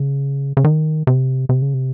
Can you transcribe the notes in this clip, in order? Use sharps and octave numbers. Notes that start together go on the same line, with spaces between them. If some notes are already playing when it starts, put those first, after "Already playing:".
Already playing: C#3
C#3
D#3
C3
C3
C#3
C3